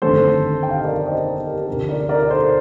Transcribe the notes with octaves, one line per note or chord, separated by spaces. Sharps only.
G1 F2 D#3 A3 A4 C5
G5
F5
D#5
A#4 D5
C5 D#5
A#4 D5
G4 A#4
D2 C3 F3 G4 A#4
A#4 D5
A#4 D5
D5
A4 C5